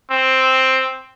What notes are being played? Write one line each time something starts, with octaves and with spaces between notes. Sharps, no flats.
C4